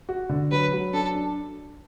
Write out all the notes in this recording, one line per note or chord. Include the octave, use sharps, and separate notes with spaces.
F#4
D3
F#3 B4
F#3
D4 A4
D4